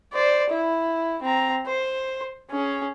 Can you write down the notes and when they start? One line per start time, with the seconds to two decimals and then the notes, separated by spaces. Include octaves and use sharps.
0.12 C5 D5
0.49 E4
1.22 C4 A#5
1.66 C5
2.51 C#4 G#4